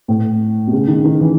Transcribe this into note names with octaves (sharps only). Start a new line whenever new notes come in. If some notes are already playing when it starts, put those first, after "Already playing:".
A2
B2
C#3
D#3
D#3
E3